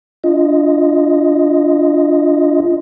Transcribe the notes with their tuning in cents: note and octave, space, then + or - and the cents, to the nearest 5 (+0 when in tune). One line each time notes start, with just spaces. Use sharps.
D4 -10 F4 -20 D#5 +0